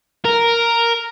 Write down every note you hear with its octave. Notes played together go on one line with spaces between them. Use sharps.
A#4